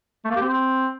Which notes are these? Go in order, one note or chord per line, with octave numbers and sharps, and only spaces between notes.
A3
A#3
G4
C4